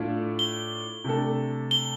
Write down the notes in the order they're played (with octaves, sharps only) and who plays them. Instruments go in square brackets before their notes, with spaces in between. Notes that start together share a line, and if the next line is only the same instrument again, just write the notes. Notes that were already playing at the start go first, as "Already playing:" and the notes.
Already playing: [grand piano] A2 A3 D4 F4
[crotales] G7
[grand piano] C3 A3 D4 A4
[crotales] G7